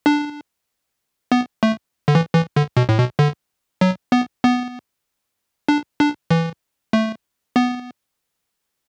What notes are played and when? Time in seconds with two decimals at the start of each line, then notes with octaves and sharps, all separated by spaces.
0.06 D4
1.32 B3
1.63 A3
2.08 D3
2.15 E3
2.35 E3
2.56 D3
2.77 B2
2.89 A2
2.98 B2
3.19 D3
3.81 F#3
4.12 B3
4.44 B3
5.68 D4
6.00 D4
6.31 E3
6.93 A3
7.56 B3